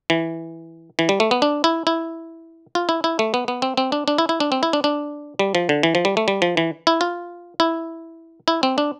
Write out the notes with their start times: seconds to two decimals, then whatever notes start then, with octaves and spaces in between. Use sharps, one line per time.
0.10 E3
0.99 E3
1.09 G3
1.20 A3
1.31 B3
1.42 D4
1.64 E4
1.87 E4
2.75 F4
2.89 E4
3.04 E4
3.19 A3
3.34 B3
3.48 B3
3.62 C4
3.77 C4
3.92 D4
4.08 D4
4.18 E4
4.29 E4
4.40 D4
4.52 C4
4.63 E4
4.73 D4
4.84 D4
5.39 G3
5.55 F3
5.69 D3
5.83 E3
5.95 F3
6.05 G3
6.17 A3
6.28 G3
6.42 F3
6.57 E3
6.87 E4
7.01 F4
7.60 E4
8.48 E4
8.63 C4
8.78 D4